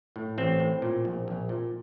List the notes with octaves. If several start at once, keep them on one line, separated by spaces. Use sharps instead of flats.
A2
A1 C4
A2
A#2
A#1
A#1
A#2